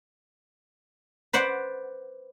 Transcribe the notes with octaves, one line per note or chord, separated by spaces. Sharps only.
B4 C5 D5 F#5